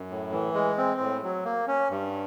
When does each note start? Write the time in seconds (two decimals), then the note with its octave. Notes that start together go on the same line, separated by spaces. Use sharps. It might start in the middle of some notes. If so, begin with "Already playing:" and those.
Already playing: F#2
0.10 A2
0.32 E3
0.55 G#3
0.78 C4
1.00 A2
1.23 F#3
1.45 A#3
1.67 C#4
1.90 G2